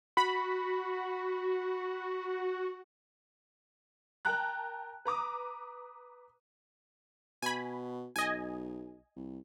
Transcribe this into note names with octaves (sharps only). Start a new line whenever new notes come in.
F#4 B5
A#4 G5 A5 A#5 F#6
B4 A#5 D6 D#6
B2 G#5 B5
B1 D#5 G#5
C2